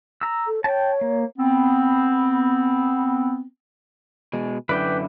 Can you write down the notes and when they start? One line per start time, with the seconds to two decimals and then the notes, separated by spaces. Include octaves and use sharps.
0.21 A#5 E6
0.47 A4
0.64 C#5 G5 A5
1.01 A#3
1.37 B3 C4
4.33 B2 G#3
4.69 F#2 D3 E4 B4 D5 G5